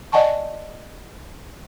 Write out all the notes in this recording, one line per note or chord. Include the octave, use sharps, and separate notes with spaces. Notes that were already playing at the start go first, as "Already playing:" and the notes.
D5 D#5 F#5 G#5 A5 C#6